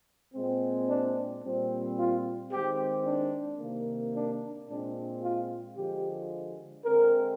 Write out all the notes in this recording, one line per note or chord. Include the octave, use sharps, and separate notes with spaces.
A#2 G#3 C4
D4
A#2 G3 C4
F4
D#3 G#3 C4 G4
D4
C3 D#3 A#3
D4
A#2 G#3 C4 D4
F4
D3 F3 G#3 G4
D3 G#3 C4 A#4